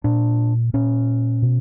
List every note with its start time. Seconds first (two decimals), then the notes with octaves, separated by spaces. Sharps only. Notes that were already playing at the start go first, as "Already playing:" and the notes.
0.04 A#2 D4
0.73 A#2 C#4
1.42 B2